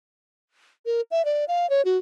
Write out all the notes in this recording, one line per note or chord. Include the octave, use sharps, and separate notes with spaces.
A#4
E5
D5
F5
C#5
F#4